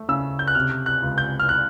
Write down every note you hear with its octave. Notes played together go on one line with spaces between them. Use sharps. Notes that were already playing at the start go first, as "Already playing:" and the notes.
Already playing: A3
C#3 E6
G6
F#6
C3 F6
F#6
C#2
G6
F6
F#6